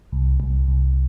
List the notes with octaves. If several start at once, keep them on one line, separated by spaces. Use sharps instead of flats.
C2
C2
C2